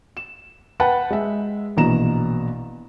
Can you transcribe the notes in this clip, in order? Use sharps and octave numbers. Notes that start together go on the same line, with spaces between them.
E7
B4 F#5 G5 A5 B5
G#3 E5
A#1 B2 E3 A#5 E7